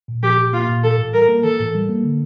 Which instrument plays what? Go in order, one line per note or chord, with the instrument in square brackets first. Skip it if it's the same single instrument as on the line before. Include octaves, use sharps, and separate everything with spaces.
[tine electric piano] A#2
[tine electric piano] F3 [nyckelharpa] G4
[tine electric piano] A#2
[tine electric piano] A#3 [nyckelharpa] F4
[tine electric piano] A#2
[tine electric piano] E3 [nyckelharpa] A4
[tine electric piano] A2
[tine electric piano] G3 [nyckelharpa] A#4
[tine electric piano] A#3
[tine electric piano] E3 [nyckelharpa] A4
[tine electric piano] A2
G3
A#3
D3